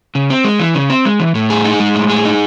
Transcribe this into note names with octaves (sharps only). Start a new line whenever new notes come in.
C#3
C4
G#3
E3
C#3
C4
G#3
E3
A2
G#4
D#4
G#3
A2
G#4
D#4